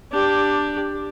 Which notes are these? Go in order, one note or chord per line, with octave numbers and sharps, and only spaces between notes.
D4 G4